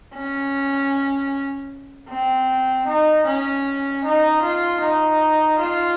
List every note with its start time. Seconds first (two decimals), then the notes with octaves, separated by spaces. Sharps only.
0.15 C#4
2.09 C4
2.87 D#4
3.27 C#4
4.04 D#4
4.42 F4
4.82 D#4
5.59 F4